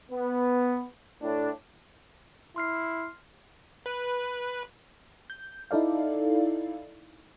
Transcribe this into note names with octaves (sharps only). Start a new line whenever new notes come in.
B3
A2 D4
E4 C6 F6 C7
B4
G6
D#4 E4 A4 D5 F5